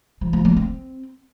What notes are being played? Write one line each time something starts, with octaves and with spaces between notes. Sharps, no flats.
F3
F3
A#3
C4